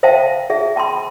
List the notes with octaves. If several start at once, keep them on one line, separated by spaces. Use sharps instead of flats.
C5 E5 F5 G5 A5
G#4 E5
G5 A5 B5 C6